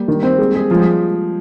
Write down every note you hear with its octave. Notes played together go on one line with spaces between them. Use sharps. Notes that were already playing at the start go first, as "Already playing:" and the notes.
Already playing: G3 A#3
D#3
C4
G#3
G#4
F3 G#3
G3